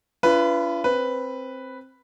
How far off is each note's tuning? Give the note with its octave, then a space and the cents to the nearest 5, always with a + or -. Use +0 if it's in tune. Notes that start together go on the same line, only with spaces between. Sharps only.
D4 -40 F4 -45 B4 +0
C4 +10 B4 +0